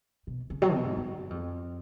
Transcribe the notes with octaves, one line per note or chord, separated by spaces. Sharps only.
B2
C#3
F#3
B2
G#2
F#2
F2